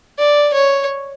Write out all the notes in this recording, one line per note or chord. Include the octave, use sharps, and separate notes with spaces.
D5
C#5